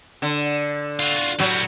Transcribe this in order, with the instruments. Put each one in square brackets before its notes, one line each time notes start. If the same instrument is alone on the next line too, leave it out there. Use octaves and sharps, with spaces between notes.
[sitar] D3
[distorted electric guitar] F4 F#4
[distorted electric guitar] A2 G3 [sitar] F#3